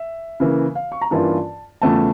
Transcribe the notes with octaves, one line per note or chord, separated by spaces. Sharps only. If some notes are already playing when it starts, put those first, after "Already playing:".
Already playing: E5
C#3 E3 A#3
F5
C#6
A#5
G2 E3 A#3 C#4 F4 A5
E2 C#3 F3 A3 A5